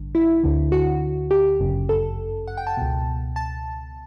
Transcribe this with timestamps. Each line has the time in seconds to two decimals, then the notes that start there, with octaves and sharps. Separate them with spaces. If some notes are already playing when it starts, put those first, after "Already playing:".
Already playing: A1 G2 D3
0.15 E4
0.44 D2 D3
0.72 F#4
1.31 G4
1.60 G1 F#2 C#3
1.89 A4
2.48 F#5
2.57 G5
2.67 A5
2.77 C#2 B2
3.36 A5